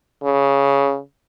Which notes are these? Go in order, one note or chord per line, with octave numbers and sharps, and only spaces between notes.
C#3